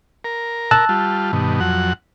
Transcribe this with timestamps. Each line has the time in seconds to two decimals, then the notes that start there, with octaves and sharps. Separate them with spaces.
0.24 A#4
0.71 A5 E6 F#6
0.89 G3 F4
1.33 G2 B2 D#3
1.60 F2 F#3 F#5